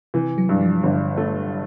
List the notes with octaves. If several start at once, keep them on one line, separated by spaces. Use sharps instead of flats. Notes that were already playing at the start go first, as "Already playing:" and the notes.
C3 E3
F#3
G2
F3
G1
A3